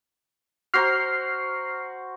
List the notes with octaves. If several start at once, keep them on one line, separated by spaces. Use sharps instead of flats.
F#4 C5 A#5 F6 C7